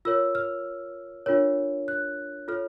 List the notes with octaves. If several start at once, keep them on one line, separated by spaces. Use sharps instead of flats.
F4 A#4 C#5 E6
F6
D4 F4 A#4 C#5
F#6
F4 A4 C#5 F6